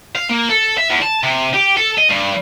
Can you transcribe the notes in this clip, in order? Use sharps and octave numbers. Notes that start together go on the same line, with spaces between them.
F5
A#3
A4
E5
E2
A5
C3
G4
A4
D#5
G2